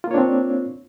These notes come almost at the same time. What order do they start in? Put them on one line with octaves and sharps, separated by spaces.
F4 A#3 C#5 D4 C4